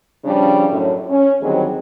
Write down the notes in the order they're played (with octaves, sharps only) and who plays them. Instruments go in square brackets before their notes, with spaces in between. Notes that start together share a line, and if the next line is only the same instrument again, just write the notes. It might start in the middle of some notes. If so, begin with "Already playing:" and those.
[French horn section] C#3 F3 G3 D4
F#2 A2
C#4
D2 D#3 F#3 G3 C4 G#4